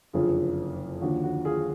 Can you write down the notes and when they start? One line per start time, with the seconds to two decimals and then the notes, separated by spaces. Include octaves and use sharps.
0.13 F#1 F2 D3 F3 F4 G#4
1.02 D#2 D3 F3 F#4
1.23 F#4
1.45 F4 G#4